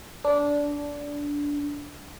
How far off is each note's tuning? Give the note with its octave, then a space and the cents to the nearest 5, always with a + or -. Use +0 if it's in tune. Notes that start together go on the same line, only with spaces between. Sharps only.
D4 -15